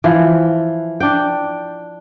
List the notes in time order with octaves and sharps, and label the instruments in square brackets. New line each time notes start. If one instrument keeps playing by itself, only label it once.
[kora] E3 F3
D4 G5